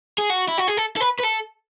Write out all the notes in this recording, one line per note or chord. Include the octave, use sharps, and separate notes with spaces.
G#4
F#4
E4
F#4
G#4
A4
A4
B4
B4
A4